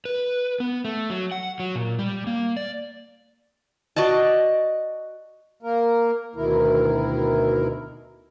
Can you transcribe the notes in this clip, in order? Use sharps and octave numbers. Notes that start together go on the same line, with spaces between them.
B4
B3
A3
F#3
F#5
F#3
A#2
G3
A#3
D5
F#4 D5 D#5 A5
A#3 A#4
D2 B2 D#3 E4 A#4